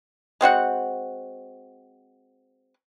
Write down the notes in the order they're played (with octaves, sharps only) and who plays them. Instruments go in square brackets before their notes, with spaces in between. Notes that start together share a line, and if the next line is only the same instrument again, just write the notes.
[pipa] G#3 C4 F#4 F#5